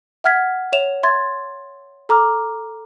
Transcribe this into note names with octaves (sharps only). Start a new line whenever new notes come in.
E5 F#5 F6 G#6 B6
C#5 E5 E7 F7
E5 C6 G#6 A6
A4 A#5 D6 F6